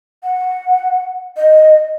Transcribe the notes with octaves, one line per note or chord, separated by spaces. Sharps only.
F#5
D#5